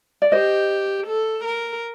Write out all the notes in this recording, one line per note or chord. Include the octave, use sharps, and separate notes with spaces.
D5
G4 C5 D#5
A4
A#4